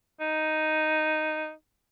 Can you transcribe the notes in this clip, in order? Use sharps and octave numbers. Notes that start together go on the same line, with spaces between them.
D#4